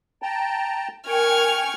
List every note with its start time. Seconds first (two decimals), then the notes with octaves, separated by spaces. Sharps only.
0.22 G5 A5 A#5
1.07 A#4 G5 G#5 C#6 F6 G#6